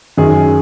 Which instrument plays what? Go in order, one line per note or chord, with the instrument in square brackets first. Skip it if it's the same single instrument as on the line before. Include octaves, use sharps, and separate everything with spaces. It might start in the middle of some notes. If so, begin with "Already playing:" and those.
[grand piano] F#2 D#3 G#4